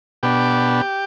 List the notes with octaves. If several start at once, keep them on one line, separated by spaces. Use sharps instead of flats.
B2 B3 D4 G4